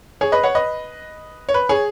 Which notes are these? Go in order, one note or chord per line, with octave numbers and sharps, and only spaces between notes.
G#4 C#5
B4 D#5
C#5 F#5
B4 D#5
C#5
B4
G#4 C#5